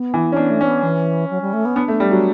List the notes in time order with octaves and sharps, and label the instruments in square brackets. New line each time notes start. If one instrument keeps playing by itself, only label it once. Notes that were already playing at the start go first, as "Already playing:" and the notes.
Already playing: [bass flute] B3
[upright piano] E3
C#4
[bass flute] B3 [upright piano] D4
[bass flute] A3
[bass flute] B3 [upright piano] C#4
[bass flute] E3
F#3
G3
A3
B3
[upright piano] B3 [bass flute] D4
[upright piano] A3
G3
F#3